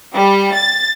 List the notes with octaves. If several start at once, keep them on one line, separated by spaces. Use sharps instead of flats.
G3
A6